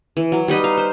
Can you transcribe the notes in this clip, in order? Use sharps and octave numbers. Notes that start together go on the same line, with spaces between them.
E3
F#3
G3 D#4 B4 D#5
F5
C5